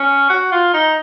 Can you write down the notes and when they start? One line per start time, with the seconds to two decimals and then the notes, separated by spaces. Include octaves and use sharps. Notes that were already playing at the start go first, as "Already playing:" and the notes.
Already playing: C#4
0.30 F#4
0.52 F4
0.74 D#4